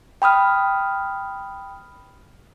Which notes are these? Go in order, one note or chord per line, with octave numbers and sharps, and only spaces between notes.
G5 B5 D#6 F6